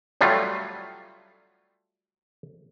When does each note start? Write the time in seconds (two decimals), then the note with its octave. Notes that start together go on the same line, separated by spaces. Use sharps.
0.21 F#3 G3 A3 F4